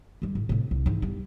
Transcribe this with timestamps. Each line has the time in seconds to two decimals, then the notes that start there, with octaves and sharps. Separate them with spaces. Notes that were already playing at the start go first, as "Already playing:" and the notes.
0.22 D2 G3
0.35 A2
0.49 A2 C3
0.71 C2
0.86 G#2 E3
1.02 E2 G3